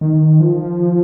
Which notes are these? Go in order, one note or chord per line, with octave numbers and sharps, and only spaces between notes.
D#3
F3